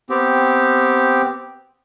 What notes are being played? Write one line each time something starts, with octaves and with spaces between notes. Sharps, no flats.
B3 C4 G4